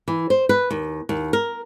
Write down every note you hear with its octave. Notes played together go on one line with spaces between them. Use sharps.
E3
C5
B4
D#2
D#2
A#4